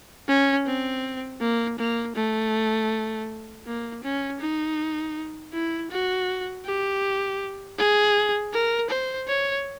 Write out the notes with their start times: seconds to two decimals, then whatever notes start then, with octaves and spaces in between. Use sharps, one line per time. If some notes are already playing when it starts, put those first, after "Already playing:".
0.28 C#4
0.66 C4
1.41 A#3
1.79 A#3
2.16 A3
3.67 A#3
4.04 C#4
4.41 D#4
5.53 E4
5.91 F#4
6.66 G4
7.79 G#4
8.53 A#4
8.90 C5
9.28 C#5